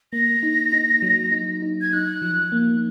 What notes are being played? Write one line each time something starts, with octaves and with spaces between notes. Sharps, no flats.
A#3 A#6
D#4
D#4
F#3
D#4
D#4
G#6
D#4 F#6
F3
A#3